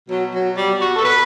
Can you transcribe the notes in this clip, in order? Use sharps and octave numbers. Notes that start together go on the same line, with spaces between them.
B2 F#3
F#3
B2
G3
B2
F#4
A4
B2 B4